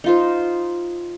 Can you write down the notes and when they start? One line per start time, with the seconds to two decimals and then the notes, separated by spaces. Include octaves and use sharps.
0.04 D#4 F4 C5